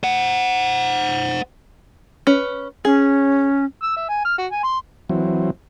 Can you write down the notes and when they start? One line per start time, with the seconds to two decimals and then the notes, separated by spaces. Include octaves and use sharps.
0.03 C5 F#5
2.27 C#4 B4
2.85 C#4 G#4
3.83 E6
3.96 E5
4.09 G#5
4.25 F6
4.38 F#4
4.51 G#5
4.63 C6
5.09 E3 F#3 C4